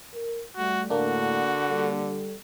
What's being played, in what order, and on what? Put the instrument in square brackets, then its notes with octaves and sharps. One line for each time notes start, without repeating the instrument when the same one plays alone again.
[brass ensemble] A#4
[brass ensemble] G3 A3 [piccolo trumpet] F#4
[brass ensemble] A2 [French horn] D3 [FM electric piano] A#3 D4 [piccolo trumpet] F#4
[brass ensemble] G3 A4